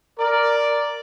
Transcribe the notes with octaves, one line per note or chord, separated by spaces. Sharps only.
A#4 D5